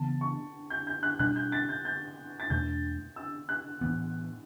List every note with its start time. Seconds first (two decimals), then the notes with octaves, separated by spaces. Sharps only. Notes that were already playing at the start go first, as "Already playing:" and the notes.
Already playing: C#3 E3 B3 A5
0.21 C#6
0.70 G6
0.87 G6
1.03 F#6
1.19 B2 G3 D4 F#6
1.36 G6
1.52 A6
1.69 G6
1.85 G6
2.40 A6
2.50 E2 B2 A3 D4 G6
3.16 E6
3.49 F#6
3.81 A2 E3 B3